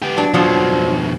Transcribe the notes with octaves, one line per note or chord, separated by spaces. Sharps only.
B3 G4
F#3 D4
F2 B2 F3 F#3 D4